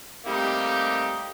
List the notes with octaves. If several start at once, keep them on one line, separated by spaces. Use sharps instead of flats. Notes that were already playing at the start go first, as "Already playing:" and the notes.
G3 A3 A#3 C4 D#4 G4